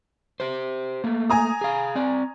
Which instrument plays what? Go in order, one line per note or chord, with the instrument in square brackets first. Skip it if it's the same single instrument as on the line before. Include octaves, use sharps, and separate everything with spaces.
[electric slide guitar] G4 C5
A3 A#3
[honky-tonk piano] G#5 A#5 D#6
[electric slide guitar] G#4 F5
C4 D5